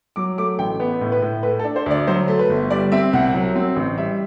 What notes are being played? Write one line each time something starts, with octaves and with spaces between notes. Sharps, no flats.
F#3 D6
A3 D6
A1 G5
B3 B4
A2
B4
A2
A3 B4
A4
D4
C5
D2 D5
F#3 C5
A3
B4
G1
G3 D5
C4 E5
C2 F#5
F#3
C4
A1
G3 E5